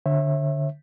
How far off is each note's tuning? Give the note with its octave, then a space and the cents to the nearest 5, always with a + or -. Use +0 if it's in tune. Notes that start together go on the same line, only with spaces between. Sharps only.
D3 +0 C#5 -40 E5 +0